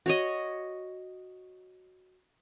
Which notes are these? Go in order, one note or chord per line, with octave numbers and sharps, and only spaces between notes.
F#4 C#5 D#5